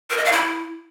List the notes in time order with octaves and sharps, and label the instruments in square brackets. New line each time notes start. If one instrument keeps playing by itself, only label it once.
[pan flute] A#4
D#5
F5
E4